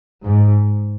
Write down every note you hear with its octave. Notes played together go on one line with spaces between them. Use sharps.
G#2